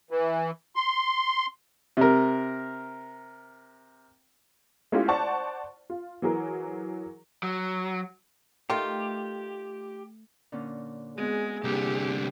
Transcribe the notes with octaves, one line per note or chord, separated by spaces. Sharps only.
E3
C6
C3 A#4
G#3 A3 C#4 E4 F4 G4
C5 D5 F#5 A5 C#6
F4
E3 F#3 G#4 A#4
F#3
D#3 A3 F4 G4
A#2 D3 C#4
G#3 B3 C4 F#4 G#4
C2 D3 A#3 G4